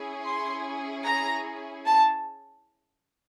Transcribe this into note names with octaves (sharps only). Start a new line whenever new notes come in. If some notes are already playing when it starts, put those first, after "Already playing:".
Already playing: C#4 E4 G#4
C6
A#5
A5